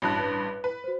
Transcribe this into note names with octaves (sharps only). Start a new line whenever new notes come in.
A1 G2 E4 F#4 A5 F#6
B4
B4
F#4 C5